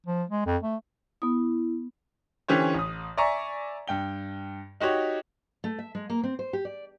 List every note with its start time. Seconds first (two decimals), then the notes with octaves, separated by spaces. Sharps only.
0.06 F3
0.30 G#3
0.46 F2
0.63 A3
1.22 B3 E4 D#6
2.48 D3 E3 C#4 G4 C5 C#5
2.74 A1 D#6
3.17 D5 E5 G#5 A#5 C#6
3.88 G2 G5 G7
4.81 D#4 F#4 G4 C#5
5.64 A3
5.79 E5
5.95 G#3
6.10 A#3
6.24 C4
6.39 C5
6.53 G4
6.65 D5